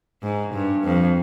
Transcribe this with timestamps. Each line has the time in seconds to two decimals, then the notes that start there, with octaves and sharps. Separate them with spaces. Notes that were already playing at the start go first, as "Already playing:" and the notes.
0.23 G#2
0.54 G2
0.84 F2